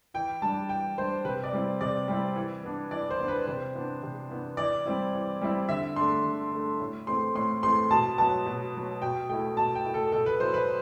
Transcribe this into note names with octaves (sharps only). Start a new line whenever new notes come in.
E3 G5
G3 D4 A5
E3 G5
G3 D4 C5
C3 B4
D5
G3 C4 E4
C3 D5
G3 C4 E4
E3
B3 D4
E3 D5
C5
B3 D4
B4
C3 C5
E3 B3 D4
C3
E3 B3 D4
E3 D5
G3 C4 E4
E3
G3 C4 E4
D3 E5
A3 D4 C6
D3
A3 D4
A2
E3 A3 C4 C6
A2 C6
E3 A3 C4 C6
B2 A5
F#3 B3 A5
B2
F#3 B3
B2 G5
A3 E4 G5
B2 A5
G5
A3 E4
A4
B2 A4
B4
F#3 B3 E4 C5
B4